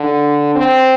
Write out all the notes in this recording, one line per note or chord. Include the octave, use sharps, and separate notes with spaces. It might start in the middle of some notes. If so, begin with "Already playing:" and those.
Already playing: D3
C4